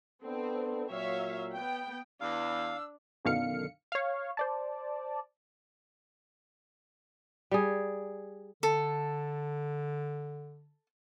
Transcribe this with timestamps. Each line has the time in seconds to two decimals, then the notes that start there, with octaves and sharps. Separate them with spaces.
0.23 B3 C4 D4 A4
0.90 A#2 F#3 C#5 E5 F5
1.54 B3 G5
2.21 E2 D4 F5 E6
3.25 F#2 B2 D3 D#3 F5 C#7
3.92 C#5 F5
4.37 C5 D5 A5
7.51 G3 G#4
8.63 D3 A4